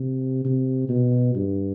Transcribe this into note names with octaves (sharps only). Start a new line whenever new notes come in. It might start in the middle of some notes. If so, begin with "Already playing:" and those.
Already playing: C3
C3
B2
G2